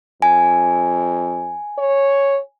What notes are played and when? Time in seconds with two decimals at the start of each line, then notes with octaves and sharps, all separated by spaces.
0.22 F2 G#5
1.79 C#5